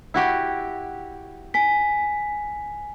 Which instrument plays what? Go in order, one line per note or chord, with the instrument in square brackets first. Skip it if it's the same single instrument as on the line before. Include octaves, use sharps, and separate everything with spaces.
[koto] E4 F#4 G4
[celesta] G#5 B6